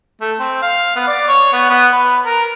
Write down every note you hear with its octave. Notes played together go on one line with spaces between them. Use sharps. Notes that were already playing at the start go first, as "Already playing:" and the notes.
A3
C4
F5
B3
D5
C#5
B3
B3
B4
A#4